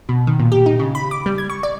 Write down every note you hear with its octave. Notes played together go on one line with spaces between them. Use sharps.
B2
D#3
A#2
G4
D#4
C#3
B5
D6
G3
G#6
C#6
D5